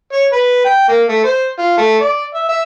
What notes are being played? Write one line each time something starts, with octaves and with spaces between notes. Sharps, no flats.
C#5
B4
G5
A#3
A3
C5
F4
A3
D5
E5
E5